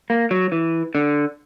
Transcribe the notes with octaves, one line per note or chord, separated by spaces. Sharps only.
A#3
F#3
E3
D3